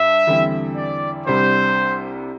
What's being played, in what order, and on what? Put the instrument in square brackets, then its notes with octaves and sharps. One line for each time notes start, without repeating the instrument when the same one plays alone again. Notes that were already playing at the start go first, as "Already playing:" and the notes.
Already playing: [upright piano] G2 [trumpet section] E5
[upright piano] E2 D3 G3 C4 E4
[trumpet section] D5
[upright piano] C2 C3 G3 D4 [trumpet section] C5